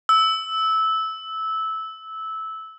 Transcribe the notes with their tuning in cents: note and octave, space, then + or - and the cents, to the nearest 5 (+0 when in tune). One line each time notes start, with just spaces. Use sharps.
E6 -15